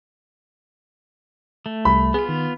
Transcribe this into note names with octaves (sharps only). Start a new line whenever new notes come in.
A3
C2 G3 B5
B3 F4 G#4
D#3